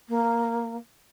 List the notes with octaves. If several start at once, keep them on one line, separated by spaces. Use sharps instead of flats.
A#3